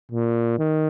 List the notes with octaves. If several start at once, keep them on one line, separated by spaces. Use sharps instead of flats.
A#2
D#3